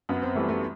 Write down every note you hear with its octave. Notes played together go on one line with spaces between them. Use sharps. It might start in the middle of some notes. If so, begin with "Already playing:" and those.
F#2 B3
C4
E3 G3 A3
A3